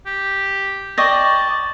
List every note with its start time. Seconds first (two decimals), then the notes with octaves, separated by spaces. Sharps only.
0.06 G4
0.98 D5 D#5 G5 A5 C#6 A#6